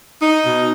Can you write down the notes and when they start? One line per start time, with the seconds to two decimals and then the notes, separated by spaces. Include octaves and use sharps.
0.22 D#4
0.45 B2